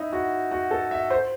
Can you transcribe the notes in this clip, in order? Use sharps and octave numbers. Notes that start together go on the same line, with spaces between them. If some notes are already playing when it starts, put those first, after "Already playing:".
Already playing: D#4 E4
F#4
F#4
A4
E5
C5